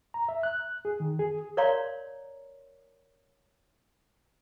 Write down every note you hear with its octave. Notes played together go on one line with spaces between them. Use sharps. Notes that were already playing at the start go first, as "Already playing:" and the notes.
A#5
E5
F#6
G#4
D#3
G#4
A#4 C#5 D5 F5 A#5 C6